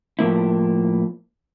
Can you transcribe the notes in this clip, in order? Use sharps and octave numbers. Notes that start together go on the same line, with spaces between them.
A2 F3 A#3 E4